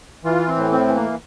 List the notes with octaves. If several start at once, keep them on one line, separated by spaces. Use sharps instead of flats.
E3 F4
C4
A2
C4
E3
A#3